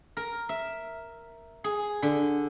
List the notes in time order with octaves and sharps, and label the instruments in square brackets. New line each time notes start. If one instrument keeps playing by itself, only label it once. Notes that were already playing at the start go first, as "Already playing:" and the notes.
[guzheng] A#4
E5
G#4
D3